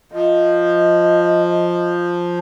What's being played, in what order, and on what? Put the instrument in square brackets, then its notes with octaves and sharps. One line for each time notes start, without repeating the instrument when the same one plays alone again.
[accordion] F3 [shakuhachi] D#5